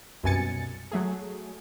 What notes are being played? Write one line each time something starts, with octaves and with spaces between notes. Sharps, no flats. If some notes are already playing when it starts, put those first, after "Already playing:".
C2 F#2 B2 G#5 A6 C#7
F#3 A3 G#4